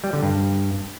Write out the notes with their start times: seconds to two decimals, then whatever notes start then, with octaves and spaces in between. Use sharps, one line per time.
0.04 G3
0.13 D3
0.23 G2